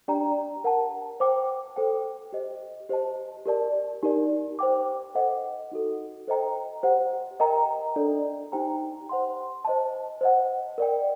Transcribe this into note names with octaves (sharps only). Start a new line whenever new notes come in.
D4 G4 D5 G5 A#5
A#4 F#5 A5
C5 G5 D6
A4 C5 G5
G4 C5 D#5
G4 C5 D#5 A5
G4 A#4 D5 A5
D#4 G4 A#4 D5
C5 G5 D6
A4 C5 D#5 F#5
D#4 F#4 A4
A4 C5 D#5 G5 A#5
G4 C5 F#5
A#4 D#5 G5 A#5
D4 A4 D5
D#4 G4 C5 G5 A#5
C5 F#5 C6
C5 D#5 A5
C5 D#5 F#5
A#4 D5 G5